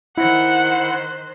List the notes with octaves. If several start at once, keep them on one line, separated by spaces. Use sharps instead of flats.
D#3 E4 C5 F#5 F#6